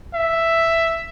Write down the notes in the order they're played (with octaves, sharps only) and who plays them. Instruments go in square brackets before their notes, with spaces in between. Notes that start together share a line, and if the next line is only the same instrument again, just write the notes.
[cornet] E5